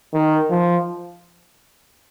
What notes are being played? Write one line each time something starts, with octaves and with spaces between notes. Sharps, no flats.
D#3
F3